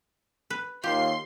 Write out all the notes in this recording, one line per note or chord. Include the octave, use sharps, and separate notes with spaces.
B4
D#2 F4 G4 C6